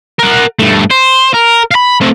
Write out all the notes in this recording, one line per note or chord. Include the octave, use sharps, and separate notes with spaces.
A#4 F#5
G2 A3
C5
A#4
F5 B5
A3 C4